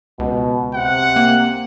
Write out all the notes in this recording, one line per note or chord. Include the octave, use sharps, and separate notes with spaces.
C#2 B2
C3 F#5
A#3